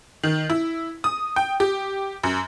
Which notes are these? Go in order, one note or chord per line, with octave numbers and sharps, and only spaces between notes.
D#3
E4
D#6
G5
G4
F#2